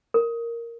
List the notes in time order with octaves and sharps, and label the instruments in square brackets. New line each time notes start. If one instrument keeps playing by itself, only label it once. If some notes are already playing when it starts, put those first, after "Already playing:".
[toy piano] A#4